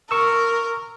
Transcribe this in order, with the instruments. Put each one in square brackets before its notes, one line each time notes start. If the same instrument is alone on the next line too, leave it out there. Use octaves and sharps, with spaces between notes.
[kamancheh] A#4 [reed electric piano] C#6 E6